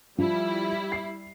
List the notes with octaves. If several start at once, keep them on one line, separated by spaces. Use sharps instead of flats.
F3 G3 E4
C7